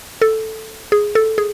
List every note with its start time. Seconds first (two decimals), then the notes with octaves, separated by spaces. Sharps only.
0.22 A4
0.92 G#4
1.15 A4
1.38 G#4